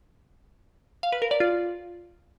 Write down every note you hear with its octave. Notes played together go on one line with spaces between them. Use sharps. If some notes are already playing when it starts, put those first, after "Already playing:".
F5
B4
A#4
D5
F4